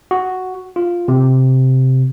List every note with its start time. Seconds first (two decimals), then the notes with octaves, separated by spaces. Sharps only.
0.11 F#4
0.76 F4
1.08 C3